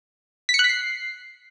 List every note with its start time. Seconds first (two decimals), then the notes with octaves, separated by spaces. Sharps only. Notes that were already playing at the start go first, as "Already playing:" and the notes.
0.49 B6
0.54 C#7
0.59 F#6
0.64 B6
0.69 C7